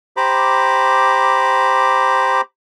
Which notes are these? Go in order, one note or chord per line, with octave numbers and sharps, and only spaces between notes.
G4 C5 A#5 B5 D6